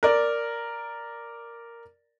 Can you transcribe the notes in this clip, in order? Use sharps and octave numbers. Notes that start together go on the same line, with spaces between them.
A#4 D5